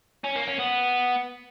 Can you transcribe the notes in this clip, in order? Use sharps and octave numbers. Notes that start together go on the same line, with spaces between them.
C#4
A#3
C#4
B3